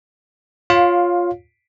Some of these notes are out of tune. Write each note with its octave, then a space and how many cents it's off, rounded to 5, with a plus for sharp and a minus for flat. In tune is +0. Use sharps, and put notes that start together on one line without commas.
F4 +5 C#5 +0 F5 +20